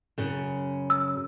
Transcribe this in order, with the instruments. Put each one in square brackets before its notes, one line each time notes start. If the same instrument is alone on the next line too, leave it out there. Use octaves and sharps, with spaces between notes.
[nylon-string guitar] F#2 C#3
[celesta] E6